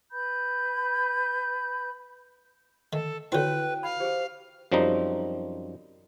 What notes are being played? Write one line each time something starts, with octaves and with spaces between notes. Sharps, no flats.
B4 B5 G6
D#3 A4
D3 C4 E4 F#4 B4 C#5 G5
F5 B5
G4 G#4 C5
F#2 F3 G3 C4 D#4 A#5